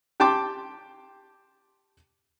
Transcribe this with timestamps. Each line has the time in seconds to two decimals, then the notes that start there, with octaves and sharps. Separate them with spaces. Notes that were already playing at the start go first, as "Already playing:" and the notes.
0.20 G4 G5 A5 C6 D6